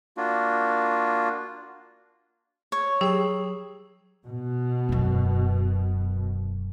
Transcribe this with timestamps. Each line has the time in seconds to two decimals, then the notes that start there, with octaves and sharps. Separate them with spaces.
0.17 A#3 D4 F4 F#4
2.72 C#5
3.01 F#3 G4 G#4 G5 D#6
4.25 B2
4.89 E1 F#2